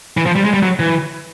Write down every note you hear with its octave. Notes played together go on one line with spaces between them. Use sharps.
E3
F3
G3
G#3
G3
F#3
E3